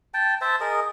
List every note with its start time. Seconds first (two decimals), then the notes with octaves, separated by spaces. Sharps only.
0.14 G5 A5
0.41 C5 E5 A5
0.60 G#4 A#4 D#5